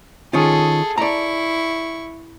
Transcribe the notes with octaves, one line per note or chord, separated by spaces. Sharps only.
D#3 C#4 F4 G#4 A4
E4 D5 A#5 C#6